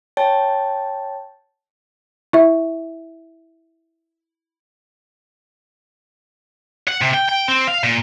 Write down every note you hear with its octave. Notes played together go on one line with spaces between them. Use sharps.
C#5 G5 A5 A6
E4 E5
F#5
C3
G5
G5
C4
F5
A#2